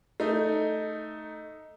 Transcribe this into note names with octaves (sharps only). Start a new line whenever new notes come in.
A3 D#4